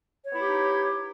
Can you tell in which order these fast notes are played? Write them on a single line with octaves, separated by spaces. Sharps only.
C#5 B3 E4 G4 D#4